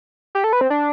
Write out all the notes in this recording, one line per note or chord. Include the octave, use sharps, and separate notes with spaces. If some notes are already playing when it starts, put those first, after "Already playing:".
G4
A4
B4
C4
D4